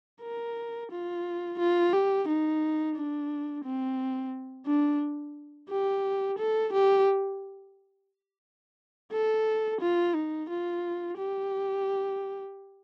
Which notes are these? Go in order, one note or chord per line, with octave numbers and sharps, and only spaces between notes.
A#4
F4
F4
G4
D#4
D4
C4
D4
G4
A4
G4
A4
F4
D#4
F4
G4